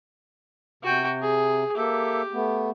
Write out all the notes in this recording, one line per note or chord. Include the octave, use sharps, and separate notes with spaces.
C3 F#4 G5
G#4
A#3 G4 A4 E5
A3 B3